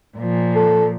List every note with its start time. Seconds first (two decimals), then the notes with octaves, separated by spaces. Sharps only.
0.17 A#2 F3
0.55 A4